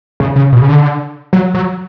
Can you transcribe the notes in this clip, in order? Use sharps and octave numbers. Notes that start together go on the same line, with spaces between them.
C#3
C#3
B2
C#3
D3
F#3
F#3